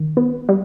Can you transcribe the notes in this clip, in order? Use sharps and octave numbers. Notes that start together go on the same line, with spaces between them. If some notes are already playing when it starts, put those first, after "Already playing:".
Already playing: D#3
B3
G3